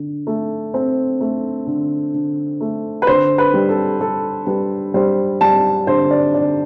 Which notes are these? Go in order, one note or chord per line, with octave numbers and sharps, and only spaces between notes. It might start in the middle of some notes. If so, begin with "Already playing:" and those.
Already playing: D3
A3
C4
A3
D3
D3
A3
B4
D3 C5
B4
G3
A4
G3 A4
G3 B4
G3 C5
G3 A5
D3 C5
D5
D3 D5